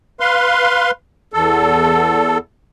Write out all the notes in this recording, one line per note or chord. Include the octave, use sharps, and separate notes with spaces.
B4 F5 C6
E2 A4